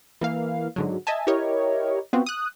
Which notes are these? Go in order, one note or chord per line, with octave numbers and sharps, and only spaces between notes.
E3 A#3 F5
G#2 D3 F#3
D#5 E5 G#5 A5
E4 G4 A#4 C#5 D#5
B3 C4 F4 F#4
D#6 F#6